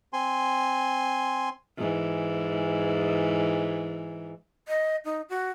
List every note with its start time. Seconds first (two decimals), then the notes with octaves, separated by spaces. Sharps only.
0.13 C4 G#5 C6
1.78 G#2 E3
4.68 D#5
5.05 D#4
5.29 F#4